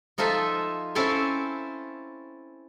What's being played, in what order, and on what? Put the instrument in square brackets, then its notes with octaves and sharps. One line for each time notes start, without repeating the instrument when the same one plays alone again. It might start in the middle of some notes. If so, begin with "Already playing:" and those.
[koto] F3 D#4 F4 A4 E5 G#5
C4 C#4 E4 A4 F5 G#5